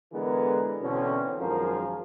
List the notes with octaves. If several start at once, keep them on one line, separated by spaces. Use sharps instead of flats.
D3 E3 G#3 B3 G#4 A#4
E2 B2 D3 C4 C#4
G#1 F#2 F3 G#4 A#4